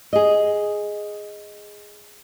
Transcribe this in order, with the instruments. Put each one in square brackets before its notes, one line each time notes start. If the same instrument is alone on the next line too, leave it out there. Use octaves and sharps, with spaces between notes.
[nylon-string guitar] G#4 D#5